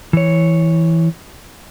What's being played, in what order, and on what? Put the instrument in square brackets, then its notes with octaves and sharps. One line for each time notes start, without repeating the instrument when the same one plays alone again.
[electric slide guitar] E3 C#5